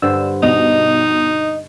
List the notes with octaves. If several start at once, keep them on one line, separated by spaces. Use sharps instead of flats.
G2 D3 C5 E6
B2 D#4 D#5 F7